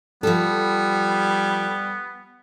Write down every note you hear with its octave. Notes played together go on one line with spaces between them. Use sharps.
F3 G3 B3 A4